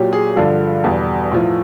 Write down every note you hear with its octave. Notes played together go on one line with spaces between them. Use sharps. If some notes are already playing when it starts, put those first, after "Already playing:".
Already playing: A#2 F#3 G4
G#4
G2 D3 F3 A4
E2 B2 G3
A2 F3